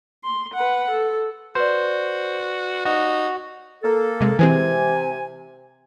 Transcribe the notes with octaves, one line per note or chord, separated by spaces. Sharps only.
C6
B4 F#5
A4
F#4 B4 C5 D5
D#4 F#4
A#3 A4
C3 G#3
C3 E3 G#3 C4 G#5